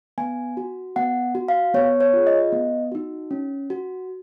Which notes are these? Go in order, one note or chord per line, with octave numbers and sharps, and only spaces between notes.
B3 G#5
F#4
B3 F#5
F#4
F5
B3 C#5
C#5
F4 G#4
D#5
B3
D#4 F#4
C#4
F#4